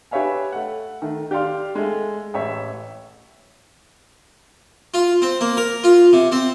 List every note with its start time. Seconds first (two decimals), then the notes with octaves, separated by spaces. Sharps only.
0.11 G4 B4 C#5 E5 F5 G#5
0.52 A3 F#5
1.02 D#3 A3
1.31 G4 D5 F5 C6 F6
1.75 G#3 A3
2.34 A1 C#5 E5
4.94 F4
5.22 C4
5.41 A#3
5.57 A#4
5.84 F4
6.13 C3
6.32 C4